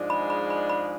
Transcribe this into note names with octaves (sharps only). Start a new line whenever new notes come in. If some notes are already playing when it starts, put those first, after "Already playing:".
Already playing: G#2 F3 G#3 D4
B5
B5
B5
B5